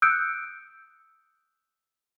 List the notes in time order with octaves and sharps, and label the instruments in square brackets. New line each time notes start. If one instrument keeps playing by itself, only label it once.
[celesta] D#6 E6 F#6 G6 C#7 D7